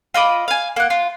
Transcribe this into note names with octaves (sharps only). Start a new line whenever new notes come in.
F4 D#5 B5 D6
F5 G#5
A#3 F#5
F4